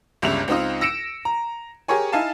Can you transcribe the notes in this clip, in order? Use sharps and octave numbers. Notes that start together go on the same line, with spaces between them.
G1 C#2 G2 C#3 E5 F7
C#2 C4 D#4 F4 D#5
E6 A#6 C#7 D7 E7
A#5
G4 G#4 A#4 C#5 G#5
D#4 E4 F5 G#5 A5